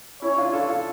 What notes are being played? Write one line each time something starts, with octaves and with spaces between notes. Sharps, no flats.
C#4 E4 C#5
D4 F4
F4 A4
F4 A4